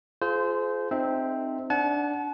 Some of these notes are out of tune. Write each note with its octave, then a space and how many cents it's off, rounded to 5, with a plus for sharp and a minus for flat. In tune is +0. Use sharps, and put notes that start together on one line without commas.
F4 +0 G#4 +40 C5 -20
C4 +0 D#4 -25 E5 -20
D4 -10 F#5 +0 A5 -40